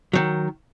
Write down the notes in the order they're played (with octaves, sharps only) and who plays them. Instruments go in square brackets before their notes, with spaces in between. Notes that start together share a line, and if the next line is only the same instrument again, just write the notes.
[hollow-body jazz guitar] D#3 F#3